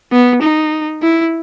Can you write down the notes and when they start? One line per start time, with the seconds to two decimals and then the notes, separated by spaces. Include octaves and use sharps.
0.12 B3
0.42 D#4
1.02 E4